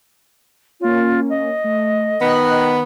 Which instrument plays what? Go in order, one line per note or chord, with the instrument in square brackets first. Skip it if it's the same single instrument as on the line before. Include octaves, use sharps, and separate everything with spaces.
[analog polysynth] A#3 C#4 [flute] F4
[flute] D#5
[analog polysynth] A3
[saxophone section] D#3 B3 [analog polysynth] F#6